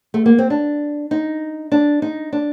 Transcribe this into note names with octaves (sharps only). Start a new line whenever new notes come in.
A3
A#3
C4
D4
D#4
D4
D#4
D4